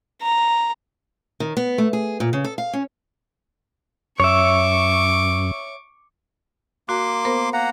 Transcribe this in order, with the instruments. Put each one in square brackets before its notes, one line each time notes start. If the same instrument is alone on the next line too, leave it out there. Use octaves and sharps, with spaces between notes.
[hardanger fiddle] A#5
[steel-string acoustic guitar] D#3
B3
A3
G#4
A#2
C#3
A4
F5
C#4
[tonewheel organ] F#2 [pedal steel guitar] C#5 E5 [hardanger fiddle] C#6 D6
[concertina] A#3 C6 D6 [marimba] F#4
[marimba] B3 A#4 C5
[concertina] A#3 F#5 A#5 [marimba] F5